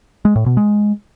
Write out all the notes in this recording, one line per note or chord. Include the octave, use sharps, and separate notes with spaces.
G#3
A2
B2
G#3